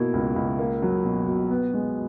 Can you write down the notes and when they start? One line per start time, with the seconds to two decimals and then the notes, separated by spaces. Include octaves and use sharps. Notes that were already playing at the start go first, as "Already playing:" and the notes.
Already playing: B2 A#3 E4
0.13 C#2
0.36 C#2
0.59 A#3
0.82 F#3
1.05 B2
1.28 B2
1.51 B3
1.74 G#3